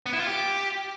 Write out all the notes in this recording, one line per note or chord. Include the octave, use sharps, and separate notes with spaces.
B3
E4
F4
G4